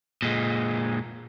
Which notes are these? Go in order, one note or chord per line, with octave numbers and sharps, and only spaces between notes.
A#2 G#3